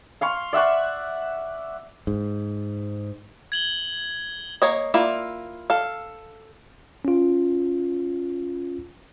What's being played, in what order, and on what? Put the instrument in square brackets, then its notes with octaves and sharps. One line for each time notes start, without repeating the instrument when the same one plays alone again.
[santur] F5 C6 C#6
D5 E5 F#5 C#6
[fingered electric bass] G#2
[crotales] G#6 F#7 G7
[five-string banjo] A#3 C#5 D#5
A#3 E4 F4 D5
A4 F5
[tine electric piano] C#4 F4